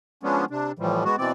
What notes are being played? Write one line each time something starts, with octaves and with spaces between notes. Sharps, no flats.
F3 G#3 B3 C#4 D4
C3 D4
A2 E3 F3 G3
G#3 B3 F#4
B2 E3 C4 D5